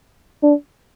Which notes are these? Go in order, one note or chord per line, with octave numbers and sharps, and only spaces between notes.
D4